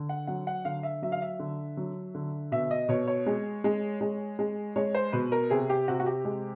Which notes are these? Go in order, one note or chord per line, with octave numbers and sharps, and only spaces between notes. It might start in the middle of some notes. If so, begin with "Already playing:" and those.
Already playing: D3
F#5
F#3 F#5
F#5
D3 F5
E5
F#3 E5
F5
E5
D3
F#3
D3
B2 E5
D#5
B2 C#5
C#5
G#3
G#3
G#3
G#3
G#3 C#5
C5
B2 B4
A#4
C3 G#4
G4
C3 F#4
F#4
G4
G#3